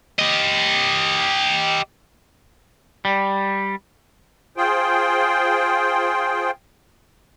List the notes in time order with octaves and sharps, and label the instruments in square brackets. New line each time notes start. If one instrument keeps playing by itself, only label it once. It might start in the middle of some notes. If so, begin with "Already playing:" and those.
[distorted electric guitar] G4 D#5
[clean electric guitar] G3
[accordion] F4 G#4 C5 G5